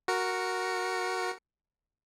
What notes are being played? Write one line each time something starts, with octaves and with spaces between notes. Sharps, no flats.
F#4 A#4 C#7